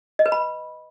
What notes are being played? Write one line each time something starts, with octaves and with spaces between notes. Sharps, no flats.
D#5
B4
B5